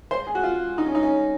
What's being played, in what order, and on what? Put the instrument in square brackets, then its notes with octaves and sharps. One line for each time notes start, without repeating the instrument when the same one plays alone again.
[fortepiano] C5
G#4
F#4
F4
D#4
C#4
D#4
C#4